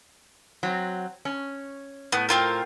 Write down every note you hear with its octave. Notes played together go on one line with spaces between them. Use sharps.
F#3 C4
C#4
A2 B3
C4 F4 A#4